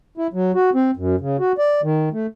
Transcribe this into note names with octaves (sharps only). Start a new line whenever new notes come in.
E4
F#3
F#4
C4
F#2
C#3
F#4
D5
D#3
A3